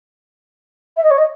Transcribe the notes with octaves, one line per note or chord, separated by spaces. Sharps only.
E5
D#5
C#5
D#5